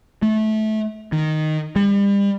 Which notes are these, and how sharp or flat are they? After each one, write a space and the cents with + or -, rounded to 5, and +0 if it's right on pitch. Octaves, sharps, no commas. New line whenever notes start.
A3 -20
D#3 -5
G3 +35